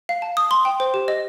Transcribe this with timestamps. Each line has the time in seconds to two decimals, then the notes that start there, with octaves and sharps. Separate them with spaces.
0.09 F5
0.22 A5
0.37 D#6
0.51 C6
0.65 G5
0.80 C5
0.94 G4
1.08 D#5